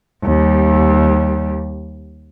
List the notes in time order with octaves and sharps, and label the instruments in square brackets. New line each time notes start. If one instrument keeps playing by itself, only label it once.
[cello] D#2 G3